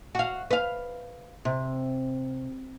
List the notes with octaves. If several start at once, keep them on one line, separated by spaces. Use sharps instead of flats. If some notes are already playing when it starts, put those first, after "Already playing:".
F#4 F5
B4 F5
C3